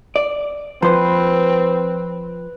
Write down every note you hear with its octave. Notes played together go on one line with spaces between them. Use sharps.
D5
F3 C4 B4 C5